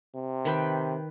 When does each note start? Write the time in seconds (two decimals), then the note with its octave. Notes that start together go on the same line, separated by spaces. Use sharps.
0.15 C3
0.45 D#3 B4 G5